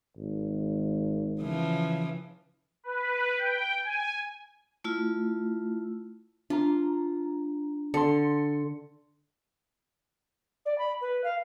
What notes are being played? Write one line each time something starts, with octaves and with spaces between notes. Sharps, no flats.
G#1
C#3 E3 F3
B4
G5
G#5
A3 E4 F4
D4 F4 A#5
D3 C6 C#7
D5
B5
B4
F5